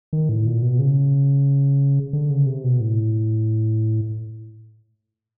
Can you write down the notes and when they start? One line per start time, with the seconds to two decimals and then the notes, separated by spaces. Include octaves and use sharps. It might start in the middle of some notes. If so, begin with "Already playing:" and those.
0.13 D#3
0.29 A2
0.46 A#2
0.62 B2
0.79 C#3
2.13 D3
2.30 C#3
2.46 C3
2.64 B2
2.80 A2